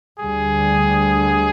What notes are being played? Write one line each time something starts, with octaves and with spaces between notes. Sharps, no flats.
D2 D3 G3 G#4